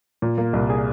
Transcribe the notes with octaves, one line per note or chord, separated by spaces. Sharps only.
A#2
A#3
C2
G#4